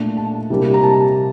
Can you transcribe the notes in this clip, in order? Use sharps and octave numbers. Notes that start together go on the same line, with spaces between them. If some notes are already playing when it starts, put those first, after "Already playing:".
Already playing: A#2 A3 D4
A5
C3 G3 A#3 D4
A#5
A5